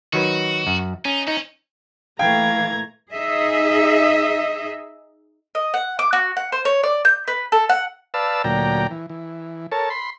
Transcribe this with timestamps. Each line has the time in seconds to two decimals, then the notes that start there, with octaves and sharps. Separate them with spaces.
0.13 D#3 F#3 F#4 B4
0.67 F#2
1.05 C#4 D#4
1.27 C#4 D#4
2.19 A#2 E3 A3 F5 G5 A#5 G#6
3.13 D#4 G#4 D#5 E5
5.55 D#5
5.74 F#5
5.99 D6
6.13 F#4
6.37 F#5
6.52 C5
6.65 C#5
6.83 D5
7.05 G6
7.28 B4
7.52 A4
7.69 F#5
8.14 B4 D5 F5 A5 E6
8.44 D2 A#2 F#3 D5 G5 A#5
8.91 E3
9.10 E3
9.72 A4 A#4 C#5 A5
9.90 B5 C6